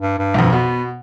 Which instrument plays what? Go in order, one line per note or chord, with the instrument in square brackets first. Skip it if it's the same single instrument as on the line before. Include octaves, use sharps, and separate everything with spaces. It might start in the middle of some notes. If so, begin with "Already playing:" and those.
[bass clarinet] G2
G2
[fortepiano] B1 F2
[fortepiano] B2 [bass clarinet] B3